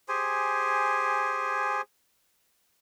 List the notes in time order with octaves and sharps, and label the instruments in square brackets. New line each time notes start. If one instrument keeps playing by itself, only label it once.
[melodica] G4 G#4 C5 G#5